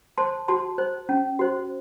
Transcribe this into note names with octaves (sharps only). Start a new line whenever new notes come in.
C5 A5 C6
F#4 A5 C6
C5
C#4
F#4 C5